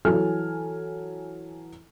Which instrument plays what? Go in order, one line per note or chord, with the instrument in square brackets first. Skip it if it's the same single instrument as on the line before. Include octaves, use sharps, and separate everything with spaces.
[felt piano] E3 F#3 A4 G#5 F6